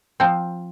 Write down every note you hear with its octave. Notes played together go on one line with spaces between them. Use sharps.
F3 C4